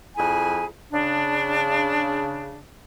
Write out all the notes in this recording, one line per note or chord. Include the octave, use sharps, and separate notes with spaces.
F2 E4 G#4 G#5
C#3 D4